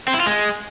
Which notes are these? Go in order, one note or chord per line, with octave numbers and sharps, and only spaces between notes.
C4
E4
F4
G#3